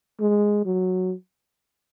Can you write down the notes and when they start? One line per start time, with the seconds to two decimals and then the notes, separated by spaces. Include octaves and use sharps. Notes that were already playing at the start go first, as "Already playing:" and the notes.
0.20 G#3
0.66 F#3